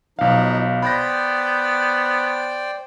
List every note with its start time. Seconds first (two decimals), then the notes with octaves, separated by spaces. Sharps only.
0.19 B1 F3 D#4 F5
0.82 B3 C5 D5 G5 B5 A#6